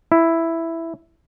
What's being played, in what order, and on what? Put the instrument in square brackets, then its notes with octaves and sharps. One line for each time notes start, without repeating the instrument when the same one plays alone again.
[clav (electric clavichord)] E4